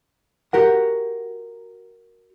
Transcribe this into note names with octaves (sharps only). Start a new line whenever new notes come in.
F#4 G4 A#4 F#5